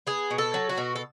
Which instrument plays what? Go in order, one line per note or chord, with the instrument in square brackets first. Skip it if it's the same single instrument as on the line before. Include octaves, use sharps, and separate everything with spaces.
[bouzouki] B3 G#4
B2
A4
F#3
F#4
B2
A4